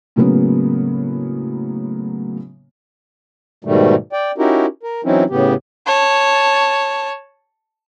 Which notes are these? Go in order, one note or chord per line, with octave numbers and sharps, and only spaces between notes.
A2 C#3 F#3 A#3 B3
G#2 B2 D#3 G3 A3
D5 G5
C#4 D#4 E4 F#4 G4 A#4
A#4
E3 F#3 C4 C#4 D#4 E4
A2 C#3 B3 G4
C#5 A5